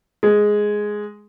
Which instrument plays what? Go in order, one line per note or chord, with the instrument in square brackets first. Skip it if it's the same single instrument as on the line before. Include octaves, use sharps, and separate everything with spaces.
[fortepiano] G#3